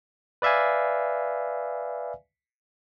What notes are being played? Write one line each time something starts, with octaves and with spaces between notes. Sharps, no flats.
B4 D5 E5 F5 G#5